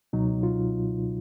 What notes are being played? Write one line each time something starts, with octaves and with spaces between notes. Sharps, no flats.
C#2 B2 F#3 D#4
F4